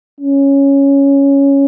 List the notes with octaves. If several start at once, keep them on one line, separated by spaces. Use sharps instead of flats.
C#4